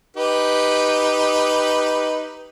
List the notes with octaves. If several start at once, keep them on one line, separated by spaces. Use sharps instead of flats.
D#4 G4 B4